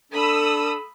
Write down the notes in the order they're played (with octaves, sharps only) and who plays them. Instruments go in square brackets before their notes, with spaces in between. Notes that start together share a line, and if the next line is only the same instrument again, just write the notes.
[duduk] D4 [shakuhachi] A4 [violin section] B5 D#6 E6